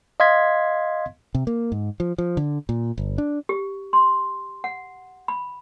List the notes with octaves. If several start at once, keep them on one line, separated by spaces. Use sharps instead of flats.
D#5 F5 C6 G#6 B6
C3
A#3
G#2
F3
F3
D3
A#2
G1
D4
G4
C6
F#5
B5